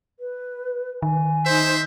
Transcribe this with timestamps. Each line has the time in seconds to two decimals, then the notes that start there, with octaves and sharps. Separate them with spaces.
0.20 B4
1.02 D#3 G#5
1.45 D#4 C5 E5